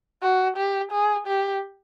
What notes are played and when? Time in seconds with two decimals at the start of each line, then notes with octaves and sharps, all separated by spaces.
0.22 F#4
0.56 G4
0.92 G#4
1.27 G4